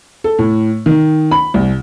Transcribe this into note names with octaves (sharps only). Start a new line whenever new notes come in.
A4
A2
D#3
B5
C2